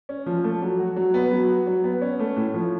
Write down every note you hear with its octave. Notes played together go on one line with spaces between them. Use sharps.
C#4
F3
A3
F#3
F#4
F#3
B3
F#3
F#4
F#3
B3
C#4
A3
A2
F3